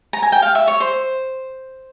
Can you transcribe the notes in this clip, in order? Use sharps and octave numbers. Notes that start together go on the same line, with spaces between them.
A#5
G#5
G5
F5
E5
C#5
C5